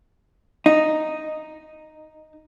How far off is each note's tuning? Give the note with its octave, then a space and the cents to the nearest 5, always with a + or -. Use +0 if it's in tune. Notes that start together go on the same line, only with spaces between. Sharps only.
D#4 -5